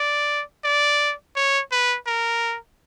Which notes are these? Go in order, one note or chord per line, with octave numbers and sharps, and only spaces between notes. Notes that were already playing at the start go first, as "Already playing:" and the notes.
Already playing: D5
D5
C#5
B4
A#4